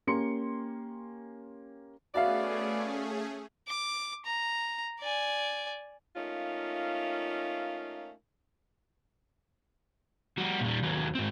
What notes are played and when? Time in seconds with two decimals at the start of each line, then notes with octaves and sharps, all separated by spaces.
0.07 A#3 C#4 G4 C6 C#7
2.15 A3 B3 C#4 F#4 G#4 D5 E5 F5
3.68 D6
4.25 A#5
5.00 D5 G#5
6.16 A3 A#3 C#4 D#4 F4
10.38 G3 F#4
10.61 A#2 G3
10.83 D#2 F#3
11.15 G#2 C4